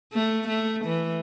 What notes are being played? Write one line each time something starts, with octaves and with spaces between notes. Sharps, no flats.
A3
A3
E3